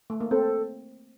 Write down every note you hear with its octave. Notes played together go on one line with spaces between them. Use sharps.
A3
A#3
C4 A4